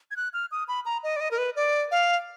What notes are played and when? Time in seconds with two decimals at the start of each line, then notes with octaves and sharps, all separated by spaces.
0.11 G#6
0.16 F#6
0.33 F6
0.51 D#6
0.68 B5
0.85 A#5
1.03 D#5
1.16 D5
1.20 D#5
1.31 A#4
1.38 B4
1.56 D5
1.91 F5